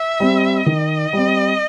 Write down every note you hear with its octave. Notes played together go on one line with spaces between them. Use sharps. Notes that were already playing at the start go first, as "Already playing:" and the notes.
Already playing: E5
G3 C4
D#3 D#5
G3 C4